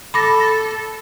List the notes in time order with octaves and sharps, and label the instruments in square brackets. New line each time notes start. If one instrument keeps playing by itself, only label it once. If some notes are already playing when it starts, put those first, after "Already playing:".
[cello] A4 [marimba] B5 D6 A#6